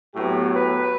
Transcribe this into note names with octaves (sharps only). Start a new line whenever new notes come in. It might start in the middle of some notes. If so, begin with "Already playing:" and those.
A2 F#3 B3 G4
B4